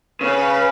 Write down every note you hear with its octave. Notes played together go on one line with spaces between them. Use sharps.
C#3 B4